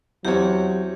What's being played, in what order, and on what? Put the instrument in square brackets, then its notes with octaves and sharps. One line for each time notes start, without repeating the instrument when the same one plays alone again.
[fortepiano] E2 C4 C#5 [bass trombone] F#3 [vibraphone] G4